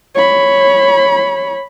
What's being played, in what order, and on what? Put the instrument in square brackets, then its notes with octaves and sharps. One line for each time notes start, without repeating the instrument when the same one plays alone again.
[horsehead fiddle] C#5 B5